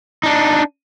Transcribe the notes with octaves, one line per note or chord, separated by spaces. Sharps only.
D4 D#4